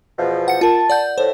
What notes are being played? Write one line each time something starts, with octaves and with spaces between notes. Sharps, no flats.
E2 B2 F3
F#5 C#7
F4 A#4 A5
D5 F#5 G6
A2 C5